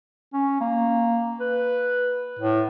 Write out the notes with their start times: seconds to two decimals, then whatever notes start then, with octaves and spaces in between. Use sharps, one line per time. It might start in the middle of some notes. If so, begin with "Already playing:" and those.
0.34 C#4
0.61 A#3
1.40 B4
2.39 A2